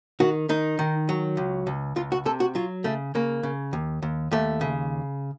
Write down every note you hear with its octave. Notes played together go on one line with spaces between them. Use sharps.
D#3 F#4
D#3 D#4
D#3
F#3
C#2
C#2
C#2 F4
F#4
C3 A4
F#4
F#3 F4
C#3 A3
C#3 A#3
C#3
D#2
D#2
D#2 A3
C#3